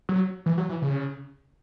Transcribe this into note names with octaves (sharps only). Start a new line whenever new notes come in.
F#3
E3
F#3
E3
C#3